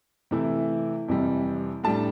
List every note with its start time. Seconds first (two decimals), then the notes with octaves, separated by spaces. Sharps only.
0.31 C3 E3 A3 E4
1.08 F2 C3 E3 G3
1.84 A2 G3 D4 A5